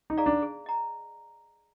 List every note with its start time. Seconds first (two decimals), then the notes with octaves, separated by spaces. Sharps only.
0.10 D#4
0.17 G#4 D5 F5 A#5
0.26 D4
0.42 G#4
0.66 D#5 A#5